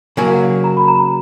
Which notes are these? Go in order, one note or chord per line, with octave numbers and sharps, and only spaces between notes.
C#3 F#3 A#3 G#5
F5
F#5
A#5
B5
A#5
A#5